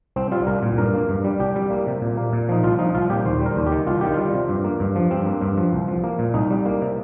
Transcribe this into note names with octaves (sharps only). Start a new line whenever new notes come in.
C2 C4
G3 F4
C2 A#4
A#2
G2 A#4
A#3
G2
G3
C2 G4
G3
A#3
C3
A#2
A#3
A#2
F3 D#4
C2 F4
F3 D#4
C2 F4
A#2 G4
D#2 C5
G3 A#4
D#2
G4
D#3
C2 F4
D#3 G4
G3 F4
C3
G2
A#3
G2
F3
G2 C4
A#3
G2
F3
C2
F3
A#3
A#2
C2 D#4
G3
A#3
C3